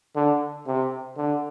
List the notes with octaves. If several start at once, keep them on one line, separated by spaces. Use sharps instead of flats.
D3
C3
D3